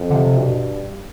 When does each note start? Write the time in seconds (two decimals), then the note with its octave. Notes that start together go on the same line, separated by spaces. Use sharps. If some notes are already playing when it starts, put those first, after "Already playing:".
Already playing: F2
0.10 D3
0.15 C3
0.37 G2 B2